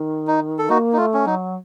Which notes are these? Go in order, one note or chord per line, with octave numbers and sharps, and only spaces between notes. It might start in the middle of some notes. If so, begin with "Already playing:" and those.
Already playing: D#3
D#4
A4
A#3 D#4 F#4
D#4
A3 F4
C#4
F#3 D#4